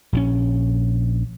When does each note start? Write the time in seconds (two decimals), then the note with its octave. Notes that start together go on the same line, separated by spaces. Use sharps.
0.13 A#1 D3 C#4